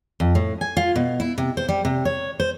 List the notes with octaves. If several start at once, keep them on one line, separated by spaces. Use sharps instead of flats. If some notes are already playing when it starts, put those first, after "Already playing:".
F2
A2
G#5
F4
B2
E4
C3
C5
G3
C3
C#5
C5